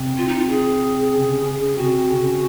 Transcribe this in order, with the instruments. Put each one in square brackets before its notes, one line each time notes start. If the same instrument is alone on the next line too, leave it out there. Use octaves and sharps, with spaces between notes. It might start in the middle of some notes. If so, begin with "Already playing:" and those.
Already playing: [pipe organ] C3 C4
[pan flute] F4
D#4
F4
G#4
[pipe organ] C#3 C#4
C#3 C#4
[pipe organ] C3 C4 [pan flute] F#4
[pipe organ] C#3 C#4